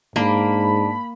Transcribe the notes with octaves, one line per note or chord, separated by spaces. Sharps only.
G#2 A#3 D4 B5